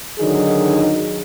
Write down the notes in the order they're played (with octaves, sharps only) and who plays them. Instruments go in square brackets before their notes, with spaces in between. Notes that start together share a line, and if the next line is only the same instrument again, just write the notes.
[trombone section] D3 D#3 F#3 D#4 G#4